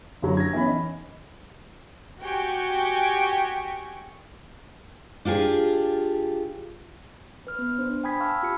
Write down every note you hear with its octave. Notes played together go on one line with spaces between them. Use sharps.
F#1 D3 F#3 A#5
G#6 A#6
E3 B3 C#4 B5
D#4
F#4 G4 G5 G#5 C#6
D4 F4 G4 G#4
B4 F6
B3
D4 C5
G5 G#5 B5 D#6 G#6 B6
F5 A5 C#6 E6 F6
F4 G4 F5 B5 C#7